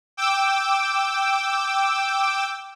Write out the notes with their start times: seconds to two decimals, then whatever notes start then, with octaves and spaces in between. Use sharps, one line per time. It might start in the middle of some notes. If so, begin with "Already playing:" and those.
0.17 G5 D6 E6